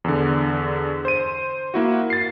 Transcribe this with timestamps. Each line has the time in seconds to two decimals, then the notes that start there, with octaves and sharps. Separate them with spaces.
0.04 E2 D3
1.05 C5 D#7
1.74 A#3 E4 F#4
2.10 A6 C7